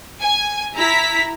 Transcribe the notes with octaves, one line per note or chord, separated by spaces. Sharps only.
G#5
E4 A#5 B6